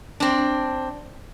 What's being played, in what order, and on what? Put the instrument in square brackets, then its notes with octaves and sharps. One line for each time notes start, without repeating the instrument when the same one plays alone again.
[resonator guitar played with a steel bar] C4 D4